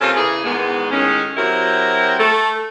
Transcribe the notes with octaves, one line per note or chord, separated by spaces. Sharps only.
C3 A3 C#4 F4 A4 A#4
E2 C#3 E3 G#4
E2 G#2 D#3 G#3 B3
A2 D#3 G#3 C#4
F#3 C4 E4 F#4 G4 A#4
A3 A4